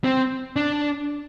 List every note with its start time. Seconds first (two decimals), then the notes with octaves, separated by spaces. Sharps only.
0.04 C4
0.56 D4